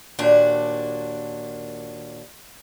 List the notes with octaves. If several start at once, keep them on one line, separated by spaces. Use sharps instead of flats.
D#2 A#2 D4 F#4